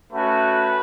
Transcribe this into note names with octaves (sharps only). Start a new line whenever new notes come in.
A3 C#4 F#4 B4